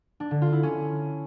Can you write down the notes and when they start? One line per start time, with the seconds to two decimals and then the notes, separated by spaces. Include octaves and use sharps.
0.20 D4
0.31 D3
0.42 F4
0.52 E4
0.63 C#4